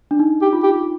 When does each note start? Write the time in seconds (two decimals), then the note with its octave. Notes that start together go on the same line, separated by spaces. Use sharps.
0.11 D4
0.19 D#4
0.42 G4
0.53 F4
0.63 G4